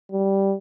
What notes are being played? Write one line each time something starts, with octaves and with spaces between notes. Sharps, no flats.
G3